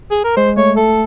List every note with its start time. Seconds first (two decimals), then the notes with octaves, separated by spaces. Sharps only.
0.11 G#4
0.24 A#4
0.37 G#3 C5
0.57 A3 C#5
0.76 A3 A4